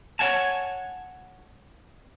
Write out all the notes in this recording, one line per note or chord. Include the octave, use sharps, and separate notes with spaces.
C#5 D5 F#5 G#5 A5